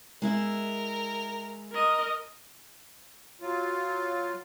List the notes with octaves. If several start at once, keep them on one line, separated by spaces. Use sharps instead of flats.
G#3 E4 A#4 E5
A#4 D#5
F#3 F4